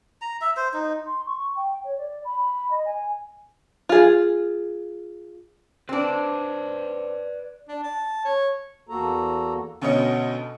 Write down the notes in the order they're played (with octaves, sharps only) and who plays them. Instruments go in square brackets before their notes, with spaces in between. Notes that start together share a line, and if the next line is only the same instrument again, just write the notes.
[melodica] A#5
E5
C5
D#4
[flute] C6
C#6
G5
C#5
D5
B5
D#5
G#5
[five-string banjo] F4 G#4
[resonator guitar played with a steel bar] C4 D4 [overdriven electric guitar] B4 D5
[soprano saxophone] D4
A5
C#5
[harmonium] E2 A#3 F#4 A4 A#5
[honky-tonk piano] D2 B2 C#4 D#5 C#7